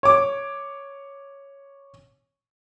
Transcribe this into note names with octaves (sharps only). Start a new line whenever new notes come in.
C#5 D6